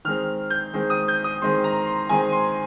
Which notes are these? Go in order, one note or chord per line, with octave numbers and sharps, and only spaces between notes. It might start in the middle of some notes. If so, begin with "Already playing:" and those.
D#3 G#3 C4 F6
G6
D#3 G#3 C4
D#6
G6
D#6
D#3 G#3 C4 C6
A#5
C6
D#3 G#3 C4 G#5
C6